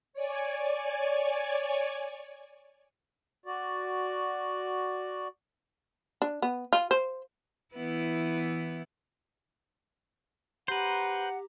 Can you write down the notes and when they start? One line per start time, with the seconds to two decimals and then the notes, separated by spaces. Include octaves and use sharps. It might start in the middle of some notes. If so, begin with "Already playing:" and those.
0.13 C#5 D5 G#5
3.46 F#4 D5
6.22 D4
6.42 B3
6.73 F4
6.91 C5
7.75 E3 B3 E4
10.68 G4 B4 C5 F#5 A#5